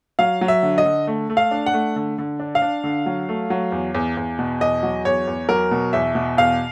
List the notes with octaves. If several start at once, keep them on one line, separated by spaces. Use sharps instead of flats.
F#3 F5
F#3
E5
D3
D#5
D3
A3
A3
F5
D4
F#5
A3
D3
D3
D4
F5
D4
D3
F#3
A3
F#3
E2
E2
E2
B2
E2 D#5
F#3
E2 C#5
E2
F#3 A#4
B2
E2 E5
B2
E2 F5